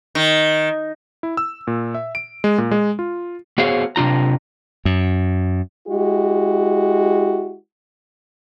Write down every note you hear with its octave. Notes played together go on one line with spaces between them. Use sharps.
D#3
E4
E6
A#2
E5
D7
G#3
A#2
G#3
F4
B3 F#4 G#4 C5 C#5 F5
C3 D4 F4 A#5
F#2
G#3 E4 F#4 G4